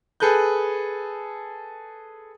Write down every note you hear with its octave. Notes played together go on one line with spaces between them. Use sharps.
G#4 A4 B4 F#6 G6